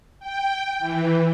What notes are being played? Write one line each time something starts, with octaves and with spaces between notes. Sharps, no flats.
G5
E3